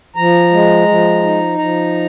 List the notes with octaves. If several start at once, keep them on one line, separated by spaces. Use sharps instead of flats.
F3 A#5
G#3
F3
D#4
F3 A#5